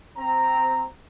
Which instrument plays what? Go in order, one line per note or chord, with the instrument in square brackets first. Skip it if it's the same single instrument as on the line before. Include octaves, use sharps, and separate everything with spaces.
[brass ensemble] C4 A#5